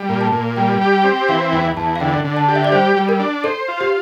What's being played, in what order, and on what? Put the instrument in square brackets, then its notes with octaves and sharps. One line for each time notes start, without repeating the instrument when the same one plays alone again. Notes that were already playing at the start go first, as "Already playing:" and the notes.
Already playing: [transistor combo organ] G3
A#2
[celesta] A5
[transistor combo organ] A#2
[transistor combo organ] G3 [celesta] G5
[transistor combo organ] G4
[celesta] G5
[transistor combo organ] C4
[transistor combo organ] E3 [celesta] F5
[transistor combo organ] E2 [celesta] G5
[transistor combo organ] E2 [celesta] A5
[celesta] F5
[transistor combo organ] D3 [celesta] G5
[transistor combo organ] D3
[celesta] A5
[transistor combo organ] G4
[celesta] E5
D5
[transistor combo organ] G3 [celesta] C5
[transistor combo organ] G3
[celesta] A#4
[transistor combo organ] D4
[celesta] A4 [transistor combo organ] C5
[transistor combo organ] F4
[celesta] G4